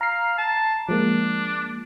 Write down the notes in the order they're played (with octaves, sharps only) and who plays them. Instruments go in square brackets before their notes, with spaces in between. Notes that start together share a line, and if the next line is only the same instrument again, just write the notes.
[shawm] F5 [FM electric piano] A#5 C7
[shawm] A5
[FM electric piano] F3 G#3 A#3 [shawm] D4